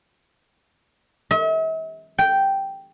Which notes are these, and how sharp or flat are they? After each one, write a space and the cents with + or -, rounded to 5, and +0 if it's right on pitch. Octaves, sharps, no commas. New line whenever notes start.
E5 -45
G5 -5